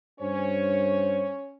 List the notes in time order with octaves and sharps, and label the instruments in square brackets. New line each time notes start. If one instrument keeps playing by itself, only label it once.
[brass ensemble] G2 C5 [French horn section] C#4 C#5